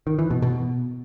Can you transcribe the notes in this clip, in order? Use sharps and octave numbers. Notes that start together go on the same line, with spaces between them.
D#3
E3
B2
B2